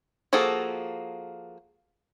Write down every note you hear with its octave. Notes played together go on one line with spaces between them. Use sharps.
F3 A#3 F#4 G#4 A4